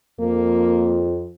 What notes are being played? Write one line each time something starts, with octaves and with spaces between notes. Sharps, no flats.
F2 A#3